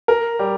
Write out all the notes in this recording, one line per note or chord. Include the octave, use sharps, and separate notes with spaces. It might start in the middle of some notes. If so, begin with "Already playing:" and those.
A#4
G3